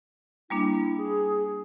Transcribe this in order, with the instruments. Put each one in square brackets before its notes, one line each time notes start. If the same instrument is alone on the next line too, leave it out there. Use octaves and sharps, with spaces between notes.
[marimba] G3 A#3 D4 [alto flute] E4
[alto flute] G#4